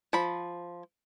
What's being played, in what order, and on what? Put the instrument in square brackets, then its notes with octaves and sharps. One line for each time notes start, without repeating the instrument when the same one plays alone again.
[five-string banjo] F3 B5